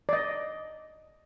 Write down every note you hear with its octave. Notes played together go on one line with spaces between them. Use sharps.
D5
D#5